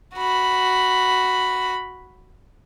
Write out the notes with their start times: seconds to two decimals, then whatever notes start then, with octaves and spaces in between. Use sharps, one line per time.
0.15 F#4 B5